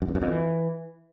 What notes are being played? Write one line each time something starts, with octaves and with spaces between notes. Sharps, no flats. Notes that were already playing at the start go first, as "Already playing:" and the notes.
F#2
E2
F#2
F2
E3